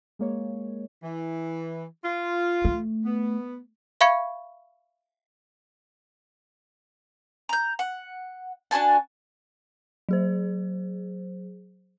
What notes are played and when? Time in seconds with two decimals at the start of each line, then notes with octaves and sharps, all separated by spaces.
0.19 G#3 A#3 C#5
1.03 E3
2.04 F4
2.65 A3
3.05 B3
4.01 E5 F5 B5 C#6 G#6 C#7
7.49 A#5 G6
7.79 F#5
8.71 D4 F#4 G#5 A5
10.09 F#3 G#4 C5